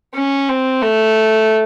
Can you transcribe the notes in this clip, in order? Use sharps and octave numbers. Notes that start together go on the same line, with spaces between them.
C#4
C4
A3